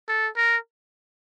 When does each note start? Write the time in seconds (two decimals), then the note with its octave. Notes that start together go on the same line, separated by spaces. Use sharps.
0.08 A4
0.37 A#4